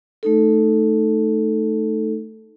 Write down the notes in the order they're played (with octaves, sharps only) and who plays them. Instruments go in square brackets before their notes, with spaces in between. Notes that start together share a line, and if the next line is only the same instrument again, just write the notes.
[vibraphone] A3 D#4 A4